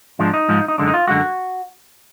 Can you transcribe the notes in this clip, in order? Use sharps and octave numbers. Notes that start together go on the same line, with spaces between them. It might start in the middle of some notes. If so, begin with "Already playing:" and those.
G#2 F3 G#3 D4
D#4
G#2 F3 G#3
D#4
F#2 D3 G#3 D4
D#4
F4
F#2 D3 G#3 F#4